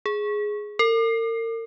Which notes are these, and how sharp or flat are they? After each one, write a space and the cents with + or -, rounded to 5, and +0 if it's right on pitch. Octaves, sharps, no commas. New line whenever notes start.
G#4 +5
A#4 -40